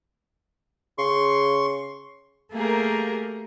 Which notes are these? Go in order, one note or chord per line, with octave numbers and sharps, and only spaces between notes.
C#3 C6 C#6
A3 A#3 G4 G#4 A#4